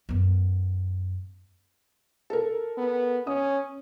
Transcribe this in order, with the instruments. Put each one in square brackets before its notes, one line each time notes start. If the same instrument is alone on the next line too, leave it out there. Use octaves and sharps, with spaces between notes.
[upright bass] F#2 B3
[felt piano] A4 A#4
[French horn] B3
[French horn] C#4 [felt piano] D#6